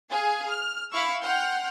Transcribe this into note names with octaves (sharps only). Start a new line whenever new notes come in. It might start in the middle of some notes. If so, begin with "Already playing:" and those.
G#4 F5 G#5
F6
E4 F5 B5 C#6 E6
F#5 G5 C6 F6 G6